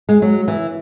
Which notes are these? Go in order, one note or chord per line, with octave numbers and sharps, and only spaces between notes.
G#3
F#3
E3